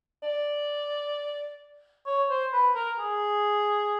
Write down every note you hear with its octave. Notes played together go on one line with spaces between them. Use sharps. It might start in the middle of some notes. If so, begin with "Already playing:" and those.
D5
C#5
C5
B4
A#4
G#4